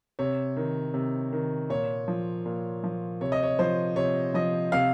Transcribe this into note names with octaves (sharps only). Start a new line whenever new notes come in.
C3 C#5
D#3
C3
D#3
A#2 C#5
F3
A#2
F3
C3 C#5
D#5
C#5
F3 C5
C3 C#5
F3 D#5
C3 F5